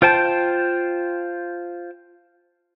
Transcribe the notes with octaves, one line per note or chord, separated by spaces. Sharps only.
F4 C5 G5 A5